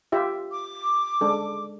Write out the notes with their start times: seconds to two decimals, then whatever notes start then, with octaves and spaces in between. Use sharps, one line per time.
0.12 F4 G4 E5
0.51 D6
1.21 G#3 D4 A4